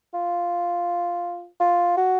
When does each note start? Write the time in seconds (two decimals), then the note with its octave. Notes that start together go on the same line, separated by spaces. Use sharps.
0.14 F4
1.60 F4
1.97 F#4